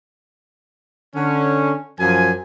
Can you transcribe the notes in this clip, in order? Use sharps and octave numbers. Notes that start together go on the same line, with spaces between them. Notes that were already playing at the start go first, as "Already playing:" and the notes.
D3 C#4
F#2 F3 G#5